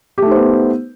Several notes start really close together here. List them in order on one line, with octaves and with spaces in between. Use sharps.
G4 A3 D#4 C5 B3